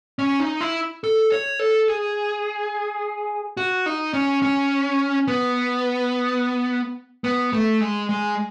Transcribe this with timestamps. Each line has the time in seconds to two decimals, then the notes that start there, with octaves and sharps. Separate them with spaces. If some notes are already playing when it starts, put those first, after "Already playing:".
0.19 C#4
0.40 D#4
0.61 E4
1.04 A4
1.32 C#5
1.59 A4
1.88 G#4
3.57 F#4
3.86 D#4
4.13 C#4
4.42 C#4
5.28 B3
7.24 B3
7.53 A3
7.80 G#3
8.09 G#3